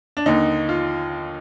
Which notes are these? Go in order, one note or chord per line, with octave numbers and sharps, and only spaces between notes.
D4
D#2 D3 D#4
F4